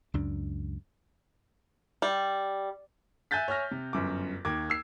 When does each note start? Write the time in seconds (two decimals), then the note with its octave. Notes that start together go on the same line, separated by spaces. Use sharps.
0.14 C#2 F#2 D4
2.02 G3
3.31 E5 G#5 F#6 G6 A6 B6
3.48 C#5 E5 G#5 F6 A#6
3.71 C3
3.93 G1 F#2 D6
4.45 D#2 A#3 D6 G#6
4.70 E6 C7